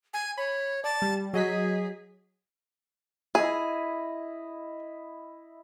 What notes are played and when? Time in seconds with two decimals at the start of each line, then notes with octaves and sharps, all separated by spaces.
0.14 G#5
0.38 C#5 B5
0.84 D5 A5
1.02 G3
1.34 F#3 G#4 D#5 B6
3.35 E4 G#4 D#5